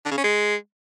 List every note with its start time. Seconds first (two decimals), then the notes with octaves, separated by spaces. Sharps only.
0.05 D3
0.11 C#3
0.17 C#4
0.24 G#3